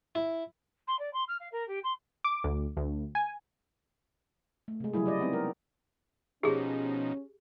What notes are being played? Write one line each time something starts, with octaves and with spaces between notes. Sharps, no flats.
E4
C6
D5
C6
F6
F5
A#4
G4
C6
D6
D2
D2
G#5
A3
C3 G#3
C#3 F#3 G3 E4 G#4
E4 D5 D#5
B3 C4 D#4
A#4
B2 F3 C#4 D#4 G4 G#4